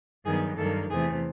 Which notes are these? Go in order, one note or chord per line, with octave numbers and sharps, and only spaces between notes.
G2 D#3 F#3 B3 G#4
G2 D#3 F#3 A#3 A4
E2 C3 E3 A3 G#4